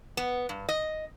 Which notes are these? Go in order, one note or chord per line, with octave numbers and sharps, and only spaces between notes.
B3
G2
D#5